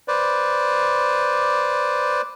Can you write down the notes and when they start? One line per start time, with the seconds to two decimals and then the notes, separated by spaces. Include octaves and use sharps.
0.08 B4 C5 D5